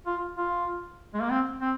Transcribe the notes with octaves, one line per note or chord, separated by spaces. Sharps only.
F4
F4
G#3
A#3
C4
C4